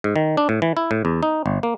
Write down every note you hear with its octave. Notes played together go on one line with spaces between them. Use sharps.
G#2
D#3
D4
A2
E3
E4
A2
E2
D#4
G1
A#3